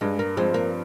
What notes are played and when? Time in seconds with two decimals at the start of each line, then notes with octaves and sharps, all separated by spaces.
0.01 G2 G#3
0.19 A#3
0.37 F3 G#3 C4
0.54 A#3